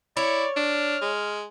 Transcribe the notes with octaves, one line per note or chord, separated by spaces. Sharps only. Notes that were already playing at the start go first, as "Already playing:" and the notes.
E4 C#5 D5
D4 F6
G#3